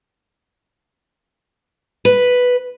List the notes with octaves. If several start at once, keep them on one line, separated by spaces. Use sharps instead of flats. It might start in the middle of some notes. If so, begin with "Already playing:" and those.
B4